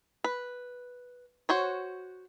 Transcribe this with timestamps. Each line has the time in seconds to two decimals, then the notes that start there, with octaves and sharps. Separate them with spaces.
0.24 B4
1.49 F#4 C5 C#5